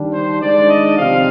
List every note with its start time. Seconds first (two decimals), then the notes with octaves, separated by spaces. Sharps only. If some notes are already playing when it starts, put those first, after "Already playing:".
Already playing: D#3 G3 D4
0.13 C5
0.40 D#3 G#3 D4 D5
0.69 D#5
0.98 C3 F3 C4 D#4 F5